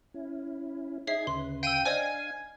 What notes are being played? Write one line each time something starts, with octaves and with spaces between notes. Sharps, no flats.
C#4 E4
D#4 G#4 C#5 E5 G#6 C7
D2 C#3 B4 C6
F5 G5 E6 D#7
D4 C5 D5 D#5 F5 G#5